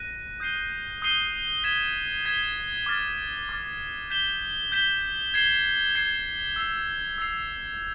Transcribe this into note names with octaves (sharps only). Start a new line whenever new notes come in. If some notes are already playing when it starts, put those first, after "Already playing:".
Already playing: F#6 A#6 D#7
D#6 G6 C7 D#7 G7
D#6 G6 C7 D#7 G7
G#6 B6 E7 G7
G#6 B6 E7 G7
D6 F6 A6
D6 F6 A6
G6 B6 E7 G7
G6 B6 E7 G7
G#6 C7 E7 G7
G#6 C7 E7 G7
E6 G#6 C7 F7
E6 G#6 C7 F7